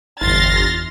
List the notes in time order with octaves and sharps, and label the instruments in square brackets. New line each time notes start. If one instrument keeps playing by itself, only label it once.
[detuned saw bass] G1 [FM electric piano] E2 E4 [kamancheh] C6 F6 [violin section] A6 A#6